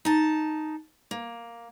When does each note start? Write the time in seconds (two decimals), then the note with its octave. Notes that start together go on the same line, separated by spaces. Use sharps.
0.05 D#4 A5
1.11 A#3